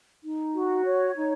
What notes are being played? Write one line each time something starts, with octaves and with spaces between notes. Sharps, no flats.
D#4
F#4
C#5
D#4